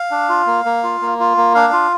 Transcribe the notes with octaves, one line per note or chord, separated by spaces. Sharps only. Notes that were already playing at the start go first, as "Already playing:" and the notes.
Already playing: F5
D4
F4
A#3
A#3
F4
A#3
F4
A#3
D4 F5
F4